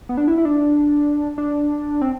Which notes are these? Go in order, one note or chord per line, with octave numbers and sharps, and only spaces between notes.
B3
D4
E4
E4
D4
D4
C4